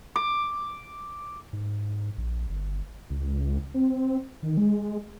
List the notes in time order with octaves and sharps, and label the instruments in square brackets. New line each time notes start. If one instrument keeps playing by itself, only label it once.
[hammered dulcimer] D6
[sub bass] G#2
A#1
G1
[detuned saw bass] C#2
C4
D#3
G#3